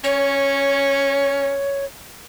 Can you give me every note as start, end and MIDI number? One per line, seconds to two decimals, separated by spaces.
0.04 1.55 61
0.04 1.85 73